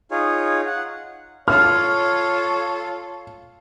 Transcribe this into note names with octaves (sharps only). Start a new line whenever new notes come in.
D#4 F4 G#4 C#5
F#5
F4 A4 C#5 F6